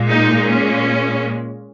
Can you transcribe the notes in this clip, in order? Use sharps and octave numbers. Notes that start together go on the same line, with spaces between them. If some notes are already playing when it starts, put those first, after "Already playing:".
Already playing: A#2 G#3
D#4
C#4